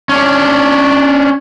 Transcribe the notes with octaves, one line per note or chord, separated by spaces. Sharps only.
C#4 D4